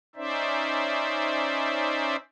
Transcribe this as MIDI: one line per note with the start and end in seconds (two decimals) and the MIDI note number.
0.16 2.16 61
0.16 2.16 63
0.16 2.16 72
0.16 2.16 74
0.16 2.16 76